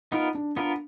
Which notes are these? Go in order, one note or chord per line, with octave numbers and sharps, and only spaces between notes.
B3 D#4 F4 A#4
D4
B3 D4 F4 A#4